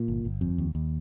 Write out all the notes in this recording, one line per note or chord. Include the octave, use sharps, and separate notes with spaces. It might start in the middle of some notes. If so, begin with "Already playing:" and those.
Already playing: A#2
G1
G1
F2
D#2
D#2